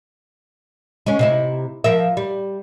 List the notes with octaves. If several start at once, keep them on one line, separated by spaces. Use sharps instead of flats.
G#3 C#4
C3 D#4 E4
F3 A#4 E5
G3